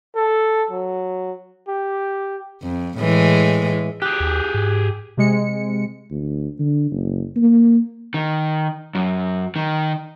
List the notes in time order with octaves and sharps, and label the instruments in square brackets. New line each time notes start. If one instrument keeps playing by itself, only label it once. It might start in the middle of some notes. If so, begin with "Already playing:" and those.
[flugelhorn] A4
F#3
G4
[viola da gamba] F2
A2 E3 G#3
[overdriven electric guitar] G4 G#4 [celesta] F#6 G6
[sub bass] D#2
G#2
[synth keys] C3 G#3 C#7
[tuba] D2
D3
F#1
A#3
[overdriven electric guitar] D#3
F#2
D#3